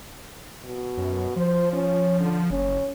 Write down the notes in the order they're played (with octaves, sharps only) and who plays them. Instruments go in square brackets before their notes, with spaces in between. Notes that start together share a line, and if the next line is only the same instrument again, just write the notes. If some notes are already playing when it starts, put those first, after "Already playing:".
[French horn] B2
[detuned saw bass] F#2
[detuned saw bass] F3 [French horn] C5
[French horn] C#4
D3
[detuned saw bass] F#1 [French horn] C#4